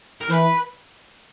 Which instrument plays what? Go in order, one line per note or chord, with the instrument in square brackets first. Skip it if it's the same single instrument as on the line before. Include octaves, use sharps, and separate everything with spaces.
[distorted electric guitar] A#4
[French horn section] E3 [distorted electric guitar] B4